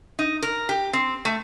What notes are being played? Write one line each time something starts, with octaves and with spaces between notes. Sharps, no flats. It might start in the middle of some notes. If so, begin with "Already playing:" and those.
D#4
A#4
G4
C4
A3